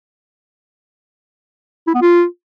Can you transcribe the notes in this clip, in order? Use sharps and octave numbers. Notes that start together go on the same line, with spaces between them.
E4
B3
F4